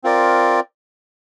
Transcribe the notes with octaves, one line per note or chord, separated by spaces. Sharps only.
C4 F4 A#4 D5